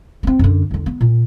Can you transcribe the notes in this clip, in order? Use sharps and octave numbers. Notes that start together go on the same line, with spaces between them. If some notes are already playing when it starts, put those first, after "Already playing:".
B3 C4
F#2 D3
E2 D3
B3
A#2